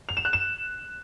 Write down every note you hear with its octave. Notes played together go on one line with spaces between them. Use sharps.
F7
E7
F#6
E7